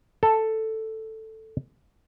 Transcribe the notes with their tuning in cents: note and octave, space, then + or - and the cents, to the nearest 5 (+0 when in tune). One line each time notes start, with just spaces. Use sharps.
A4 +5